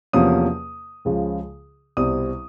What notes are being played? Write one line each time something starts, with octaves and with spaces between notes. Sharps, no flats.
E2 C3 F3 A#3 C#4 D#6
C#2 C#3 F3 G#3
C2 B2 G3 C4 D#6